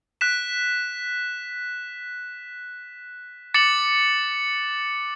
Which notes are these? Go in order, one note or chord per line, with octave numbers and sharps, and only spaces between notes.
F#6 B6 E7
D6 A6 C#7 F#7